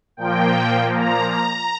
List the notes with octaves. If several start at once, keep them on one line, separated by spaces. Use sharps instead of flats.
A#2 F3 A#3 G5
A#5
A#5